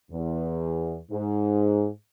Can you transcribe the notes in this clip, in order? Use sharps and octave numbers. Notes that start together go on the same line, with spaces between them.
E2
G#2